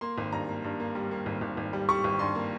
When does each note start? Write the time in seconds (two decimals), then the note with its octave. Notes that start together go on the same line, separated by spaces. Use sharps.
0.01 A#3 C6
0.18 G#1
0.32 G2 A#5
0.49 A#3
0.64 G2
0.80 A#3
0.95 G3
1.11 A#3
1.26 G#1
1.41 G#1
1.57 G#1
1.73 G3
1.89 G3 C#6
2.04 G#1
2.19 G2 C6
2.35 A#3